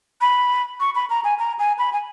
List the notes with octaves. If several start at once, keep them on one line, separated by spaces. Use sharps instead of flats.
B5
C#6
B5
A#5
G#5
A#5
G#5
B5
G#5